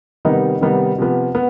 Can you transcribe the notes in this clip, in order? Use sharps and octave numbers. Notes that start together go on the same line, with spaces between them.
C3 D#3 G3 B3 D#4
C3 D#3 G3 B3 D#4
C3 F3 B3
B3